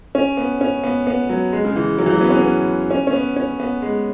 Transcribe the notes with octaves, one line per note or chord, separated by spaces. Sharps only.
C#4
B3
C#4
B3
B3
F#3
G#3
C#3
E3
F#3
E3
F#3
B3
C#4
B3
C#4
C#4
B3
C#4
B3
G#3